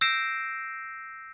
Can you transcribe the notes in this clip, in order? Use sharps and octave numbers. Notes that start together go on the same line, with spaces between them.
E6 G6 A#6 C7 D7 E7